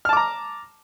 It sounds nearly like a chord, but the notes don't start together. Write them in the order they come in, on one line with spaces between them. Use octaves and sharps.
F6 A5 D6 A#5